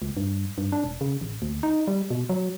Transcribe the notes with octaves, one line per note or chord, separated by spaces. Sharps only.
C#2
G2
G2
D4
E1
C#3
A1
D2
D#4
G3
B2
F#3